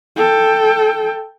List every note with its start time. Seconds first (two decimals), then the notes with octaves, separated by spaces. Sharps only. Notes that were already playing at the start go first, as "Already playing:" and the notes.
0.16 A4 G5